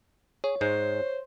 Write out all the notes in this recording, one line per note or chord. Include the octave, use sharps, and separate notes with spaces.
G#4 C#5
G#2 G#3 C5